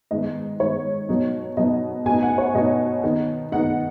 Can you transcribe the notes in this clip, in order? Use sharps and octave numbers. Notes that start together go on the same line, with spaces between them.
G#2 D#3 B3 D#5
G#2 D#3 B3 C#5
B2 F#3 B3 D#4
B2 F#3 B3 D#4 D#5
B2 B3 D#4 G#5
F#5
C#5
B2 B3 D#4 D#5
D#3 B3 D#4
D#3 B3 D#4 F#5